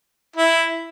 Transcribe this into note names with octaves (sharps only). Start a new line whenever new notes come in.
E4